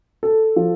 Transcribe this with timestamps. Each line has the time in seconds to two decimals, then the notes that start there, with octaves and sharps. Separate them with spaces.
0.23 A4
0.56 F3